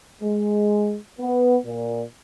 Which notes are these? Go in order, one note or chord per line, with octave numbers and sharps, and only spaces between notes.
G#3
B3
A#2